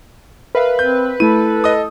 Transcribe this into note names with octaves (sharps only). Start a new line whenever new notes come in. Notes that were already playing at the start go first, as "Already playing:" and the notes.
A#4 B4 E5 F5
C4 G6
A3 E4 A4 D#7
D#5 D#6